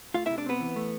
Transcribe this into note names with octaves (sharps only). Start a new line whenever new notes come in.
A3 F4 F5
E4 E5
C3
D4 D5
B3 C4 B4
E3
A3